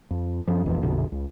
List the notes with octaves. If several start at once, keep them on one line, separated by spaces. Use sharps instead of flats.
F2
F#2 F3
E1 A#1 F2 E3
A#1 F2 B2 D3
C#2